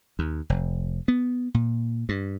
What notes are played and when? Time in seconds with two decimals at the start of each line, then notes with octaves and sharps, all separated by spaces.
0.19 D#2
0.50 F1
1.08 B3
1.54 A#2
2.09 G2